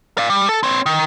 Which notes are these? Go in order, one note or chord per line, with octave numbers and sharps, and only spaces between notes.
D5 F5
G3
A4
C4 C#5
D#3